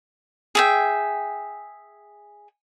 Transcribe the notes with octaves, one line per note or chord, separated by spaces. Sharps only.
G#4 E5 G5